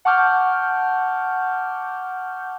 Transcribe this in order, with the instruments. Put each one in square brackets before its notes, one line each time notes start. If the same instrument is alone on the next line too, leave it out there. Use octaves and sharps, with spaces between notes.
[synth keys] F#5 A5 C#6 D6 F6 G6